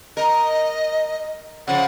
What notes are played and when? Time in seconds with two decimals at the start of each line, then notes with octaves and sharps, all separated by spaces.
0.17 A#4 D#5
1.68 C#3 F3 F#5